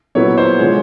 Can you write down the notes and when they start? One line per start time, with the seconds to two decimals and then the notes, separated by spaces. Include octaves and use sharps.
0.15 A#2 F#3 B3 E4 C#5
0.38 C5
0.59 D3 F3 G#3 C#5